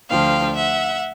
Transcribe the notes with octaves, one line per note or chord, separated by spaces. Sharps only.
D2 D3 F3 F5 G5
E5 F#5